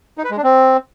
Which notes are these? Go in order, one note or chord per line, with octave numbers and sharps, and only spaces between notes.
D#4
B4
G#3
D4
C4